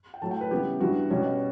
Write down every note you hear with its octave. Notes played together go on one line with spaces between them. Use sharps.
G5
A2 F#3 A3 A5
G5
B4
C#3 E3 G3 B3 G4
G2 E3 G3 B3 F#4
B2 G3 C#4